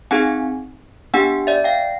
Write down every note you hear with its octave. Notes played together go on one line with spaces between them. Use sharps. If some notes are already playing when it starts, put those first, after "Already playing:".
C4 D#4 G#4 F#5 G#5
B3 D4 G4 F#5 G#5
D5 E5
F5 G5